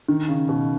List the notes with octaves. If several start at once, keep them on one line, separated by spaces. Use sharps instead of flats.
D#3
C#3
B2